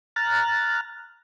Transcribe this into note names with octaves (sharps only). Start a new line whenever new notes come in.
A#5 F6 F#6 A6